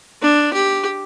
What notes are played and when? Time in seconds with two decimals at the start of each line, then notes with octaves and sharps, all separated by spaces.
0.22 D4
0.53 G4